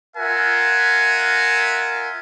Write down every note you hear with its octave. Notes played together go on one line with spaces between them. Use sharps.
F4 A#4 E5 F#5 G#5